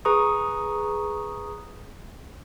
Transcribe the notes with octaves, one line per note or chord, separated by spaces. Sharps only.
G#4 B4 A#5 C#6 D#6